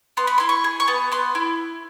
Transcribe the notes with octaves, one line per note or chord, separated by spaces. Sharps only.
B3 C6
B5
E4 C6
C#6
G#4
C#6
B3
B3 C6
E4